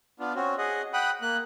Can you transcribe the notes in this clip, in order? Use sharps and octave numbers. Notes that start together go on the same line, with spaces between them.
B3 D4 F4
C4 C#4 F#4
G#4 D#5 F#5
F#5 G5 B5 D#6 F#6
A#3 F#6